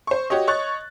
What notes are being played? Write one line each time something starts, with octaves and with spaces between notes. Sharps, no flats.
C5 C#6
F#4 G4 C#5 D#5
C#5 D#5 C#6 F#6 A6